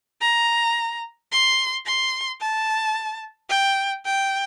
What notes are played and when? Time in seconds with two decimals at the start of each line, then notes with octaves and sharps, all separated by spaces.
0.21 A#5
1.32 C6
1.86 C6
2.41 A5
3.49 G5
4.05 G5